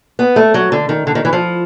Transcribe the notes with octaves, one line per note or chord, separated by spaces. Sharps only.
B3
A3
F#3
D3
D#3
D3
D#3
E3
F3